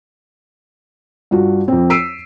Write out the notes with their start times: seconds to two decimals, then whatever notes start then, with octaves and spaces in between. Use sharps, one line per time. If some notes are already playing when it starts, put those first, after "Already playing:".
1.31 G2 F4 F#4
1.68 F2 C4
1.90 E6 B6 C7 D7 D#7